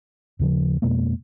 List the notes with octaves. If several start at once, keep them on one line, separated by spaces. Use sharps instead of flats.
D#2 C#3 F3
F2 B2 G#3 A#3